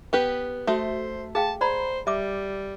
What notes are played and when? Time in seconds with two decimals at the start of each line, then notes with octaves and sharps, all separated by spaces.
0.13 B3 G4 B4
0.67 A3 F#4 A4 C5 E5
1.35 G#4 F5 G5 A5
1.61 C5 D5 A#5 B5
2.07 G3 E5 D6